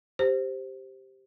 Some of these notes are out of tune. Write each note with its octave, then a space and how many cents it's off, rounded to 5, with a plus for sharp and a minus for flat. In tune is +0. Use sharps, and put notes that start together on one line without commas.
G4 +0 C5 +0